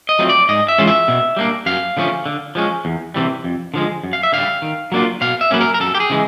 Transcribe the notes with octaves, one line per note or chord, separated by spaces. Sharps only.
D#5
F#3 A3 C4 F4
D5
G#2 D#5
E5
E3 G#3 C#4 F4
E5
B2
G3 A#3 D4
F#2 F5
D3 F3 A3 C#4
D3
F3 G#3 C#4
E2
C3 E3 G3
F2
D3 F3 G#3
F#2
F5
E5
D3 G3 F5
D#3
F#3 A#3 D4 F4
B2 F5
E5
F#3 A#3 C#4 B4
A#4
A#4
F#2 A4
G4
G#4
C#3 E3 G#3